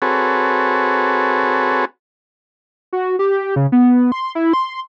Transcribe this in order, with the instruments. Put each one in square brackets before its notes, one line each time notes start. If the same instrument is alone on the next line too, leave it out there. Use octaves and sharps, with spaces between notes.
[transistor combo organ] C4 F#4 G#4 A4 B4 C#5
[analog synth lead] F#4
G4
C#3
B3
C6
E4
C6